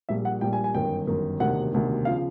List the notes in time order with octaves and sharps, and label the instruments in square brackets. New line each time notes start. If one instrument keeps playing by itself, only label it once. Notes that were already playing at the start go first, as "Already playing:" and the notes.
[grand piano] A#1 A#2 G3 E5
F#5
A#1 A#2 G3 G5
G#5
G#5
G1 F#2 D#3 G5
G1 F#2 D#3
E1 D2 C3 D#3 F#5
E1 D2 C3 D#3
C#3 F3 F5